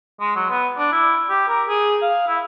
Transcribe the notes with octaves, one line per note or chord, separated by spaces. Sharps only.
G#3
F#3
B3
D4
E4
G4
A#4
G#4
F5
E4